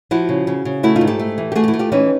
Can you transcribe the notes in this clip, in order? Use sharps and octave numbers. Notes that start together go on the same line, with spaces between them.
F3 E4 F#4
C#3
C#3
C#3
A3 E4 F#4
D#4 F4
G#2
G4 A4
A3
E3
G4
A3 F#4 G#4
G4
E4 F#4
A3
F4 G4
E3 C#4 D#4